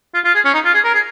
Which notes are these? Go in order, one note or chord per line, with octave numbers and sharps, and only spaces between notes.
F4
F4
G#4
C#4
D#4
F4
G#4
A#4
G#4